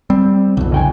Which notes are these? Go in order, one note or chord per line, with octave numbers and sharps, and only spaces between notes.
G3 C4
B1 F2 D3
C#3 G5 G#5